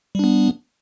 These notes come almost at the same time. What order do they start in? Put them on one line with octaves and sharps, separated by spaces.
G3 D4 B3